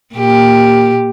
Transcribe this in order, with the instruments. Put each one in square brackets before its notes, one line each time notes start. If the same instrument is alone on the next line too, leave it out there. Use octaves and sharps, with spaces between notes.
[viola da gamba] A#2 G4